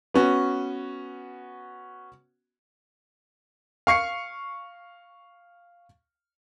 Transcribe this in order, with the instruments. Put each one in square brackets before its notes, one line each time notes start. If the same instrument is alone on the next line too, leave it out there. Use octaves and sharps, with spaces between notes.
[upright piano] B3 C#4 F#4
[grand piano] F5 C#6 C7 C#7